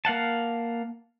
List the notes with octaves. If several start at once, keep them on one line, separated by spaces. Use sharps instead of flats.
A#3 F5 F#5 A5